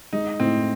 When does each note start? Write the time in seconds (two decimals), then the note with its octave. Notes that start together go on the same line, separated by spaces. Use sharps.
0.13 G#3 D#4
0.40 A2 C4